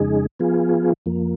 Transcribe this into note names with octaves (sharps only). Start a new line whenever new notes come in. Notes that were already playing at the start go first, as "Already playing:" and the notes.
Already playing: F2 C#3 G#3 D#4 G#4
F3 B3 F4 G#4
F2 F3 A#3